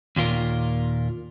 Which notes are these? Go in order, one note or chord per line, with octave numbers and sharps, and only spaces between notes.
D#2 A#2 F4 A#4